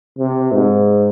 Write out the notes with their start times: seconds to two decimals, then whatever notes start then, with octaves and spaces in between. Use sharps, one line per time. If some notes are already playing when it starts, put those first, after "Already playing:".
0.18 C3
0.52 G#2